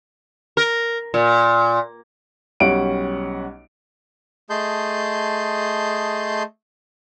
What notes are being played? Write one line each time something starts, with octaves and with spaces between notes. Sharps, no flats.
A#4
A#2
B1 G3 C#4 F#5 D7
A3 G#4 D#5 A5 C6 G6